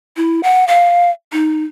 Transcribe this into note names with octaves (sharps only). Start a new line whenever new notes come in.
E4
F#5
F5
D#4